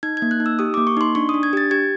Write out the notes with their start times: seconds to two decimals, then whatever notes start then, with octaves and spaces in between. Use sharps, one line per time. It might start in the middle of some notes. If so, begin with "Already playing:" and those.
0.03 D#4 G#6
0.17 G#6
0.22 A#3
0.31 F#6
0.40 D#4
0.46 E6
0.59 G4 D#6
0.74 A#3 D6
0.87 C#6
0.97 D#4 C6
1.15 D4 C#6
1.29 D#6
1.34 D4
1.43 G#6
1.53 G4 A6
1.71 G4 G#6